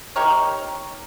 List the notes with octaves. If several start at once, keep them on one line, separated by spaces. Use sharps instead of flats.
D#4 G4 A#4 C#5